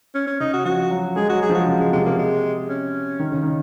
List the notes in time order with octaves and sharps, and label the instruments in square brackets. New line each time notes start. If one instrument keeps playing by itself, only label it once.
[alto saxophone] C#4
C#4
[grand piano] C#3 [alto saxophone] D#4
[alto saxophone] F#4
[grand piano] F3 [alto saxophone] F#4
[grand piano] F#3
[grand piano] G#3 [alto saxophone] G#4
[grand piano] F#3 [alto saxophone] F#4
[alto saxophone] G#4
[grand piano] F3 [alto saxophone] F#4
[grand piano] C#3
[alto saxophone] G#3
[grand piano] C3 [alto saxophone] G#3
[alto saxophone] A#3
G#3
C#4
[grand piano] D#3
C#3
D#3